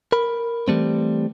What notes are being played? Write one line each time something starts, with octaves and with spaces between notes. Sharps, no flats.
A#4 B5
E3 G3 A3 C4